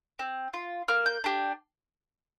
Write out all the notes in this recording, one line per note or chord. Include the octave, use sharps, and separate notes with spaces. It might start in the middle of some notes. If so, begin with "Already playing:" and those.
C4
F4
A#3 F6
G6
D4 G4